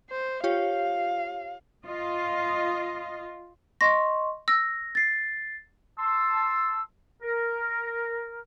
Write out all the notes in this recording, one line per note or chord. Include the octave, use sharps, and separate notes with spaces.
C5
F4 G4 C#5 F5
F4 D#5
D#5 C6 C#6 A#6
E6 A#6
A6 C7
A5 C6 E6
A#4